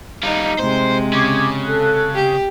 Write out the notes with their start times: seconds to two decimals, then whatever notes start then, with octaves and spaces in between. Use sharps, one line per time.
0.24 G3 D#4 F4
0.60 C3 G#3 C5
1.13 C#3 D6 G#6
1.64 A4 F#6
2.14 G4